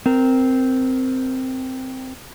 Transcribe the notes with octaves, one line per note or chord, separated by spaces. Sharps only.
C4 A#4